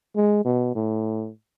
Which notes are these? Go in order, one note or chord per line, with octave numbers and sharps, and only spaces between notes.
G#3
B2
A2